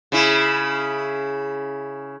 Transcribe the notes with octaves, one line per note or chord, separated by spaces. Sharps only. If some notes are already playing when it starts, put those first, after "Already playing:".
C#3 E4